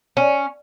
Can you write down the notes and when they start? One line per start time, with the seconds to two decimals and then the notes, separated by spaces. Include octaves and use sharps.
0.17 C#4